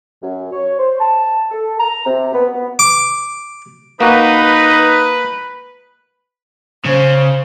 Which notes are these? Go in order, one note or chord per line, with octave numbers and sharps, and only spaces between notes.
F#2
C#5
C5
A5
A4
A#5
C3
B3
B3
D6
A#3 D#4 F#4 B4
C#3 C5